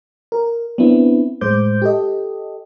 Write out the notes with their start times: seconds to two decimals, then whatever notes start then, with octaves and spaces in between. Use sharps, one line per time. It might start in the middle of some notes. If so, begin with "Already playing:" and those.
0.32 A#4
0.78 B3 C4 D4 E4
1.41 A2 G#3 C5 D6 G6
1.82 G4 A4 D#5